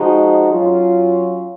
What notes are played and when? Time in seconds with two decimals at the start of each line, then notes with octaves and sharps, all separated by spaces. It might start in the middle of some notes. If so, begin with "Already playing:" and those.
Already playing: F3 G#3 D#4 F#4
0.50 F#3 C#4 F4